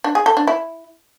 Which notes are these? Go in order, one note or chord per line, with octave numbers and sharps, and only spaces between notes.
D4
G#4
A4
D4
E4